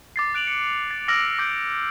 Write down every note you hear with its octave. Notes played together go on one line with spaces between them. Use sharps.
D6 A6 C7
F#6 D7 F7 F#7
C#7
A6
D6 E6 F6 A#6 D7 F#7
D6 G6 A#6 C#7 D7